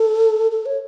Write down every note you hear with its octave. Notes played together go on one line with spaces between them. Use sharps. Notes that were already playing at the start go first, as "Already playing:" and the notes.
Already playing: A4
A4
C#5